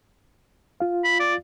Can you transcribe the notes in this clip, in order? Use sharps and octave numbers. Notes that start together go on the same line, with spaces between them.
F4 F5
B5
D5